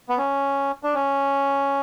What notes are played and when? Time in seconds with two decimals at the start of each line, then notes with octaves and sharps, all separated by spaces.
0.09 B3
0.18 C#4
0.83 D4
0.94 C#4